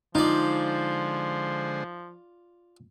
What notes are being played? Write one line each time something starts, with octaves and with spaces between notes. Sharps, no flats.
D3 F3 G#3 D#4 F4 C5 D5